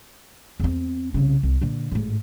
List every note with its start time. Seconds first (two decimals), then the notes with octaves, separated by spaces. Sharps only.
0.60 E2 C4
1.14 C2 C#3
1.43 C2
1.61 A#2 D3
1.91 A1 G#2